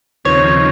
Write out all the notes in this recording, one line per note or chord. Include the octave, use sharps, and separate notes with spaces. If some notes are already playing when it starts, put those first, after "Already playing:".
D#2 C#3 F3 C4 D#4 C#5